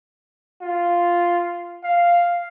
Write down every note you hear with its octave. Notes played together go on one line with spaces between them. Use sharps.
F4
F5